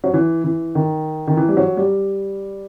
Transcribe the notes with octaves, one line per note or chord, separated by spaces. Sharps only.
F#3
E3
E3
D#3
D#3
E3
G3
F#3
G3